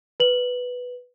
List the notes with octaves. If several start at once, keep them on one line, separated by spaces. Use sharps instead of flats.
B4 F#7